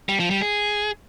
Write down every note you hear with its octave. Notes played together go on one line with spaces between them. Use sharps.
G3
F3
G3
G#4